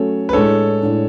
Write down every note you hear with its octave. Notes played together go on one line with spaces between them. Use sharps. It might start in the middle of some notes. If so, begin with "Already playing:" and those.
Already playing: F#3 A3 C#4 A4 C#5
B4
A2 G#3 D4 A4 C#5
A2 G#3 D4